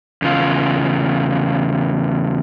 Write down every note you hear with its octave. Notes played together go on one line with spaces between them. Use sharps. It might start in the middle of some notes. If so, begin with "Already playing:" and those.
E2 C#3 F4